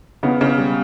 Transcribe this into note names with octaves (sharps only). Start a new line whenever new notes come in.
C#3 B3
C#3
G3